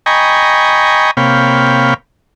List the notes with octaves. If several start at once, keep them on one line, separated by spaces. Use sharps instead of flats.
D#5 G5 G#5 A#5 B5 C#6
C3 A#3 C#5 F5 G5 B5